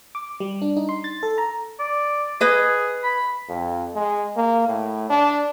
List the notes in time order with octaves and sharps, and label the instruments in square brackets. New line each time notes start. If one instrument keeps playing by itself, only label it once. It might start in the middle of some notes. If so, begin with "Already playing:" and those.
[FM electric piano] D6
G3
D4
D#4
C6
A6
A4
A#5
[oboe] D5
[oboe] G#4 [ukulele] B4 D#5
[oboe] B5
[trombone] F2
G#3
A#3
A2
D4